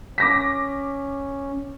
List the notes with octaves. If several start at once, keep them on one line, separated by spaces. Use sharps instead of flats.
C#4 D6 A#6 B6